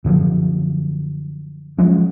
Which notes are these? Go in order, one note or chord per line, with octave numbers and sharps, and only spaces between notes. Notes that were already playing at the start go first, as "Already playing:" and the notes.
F#2 D3 F3 F#3
F3 F#3 G#3 C#4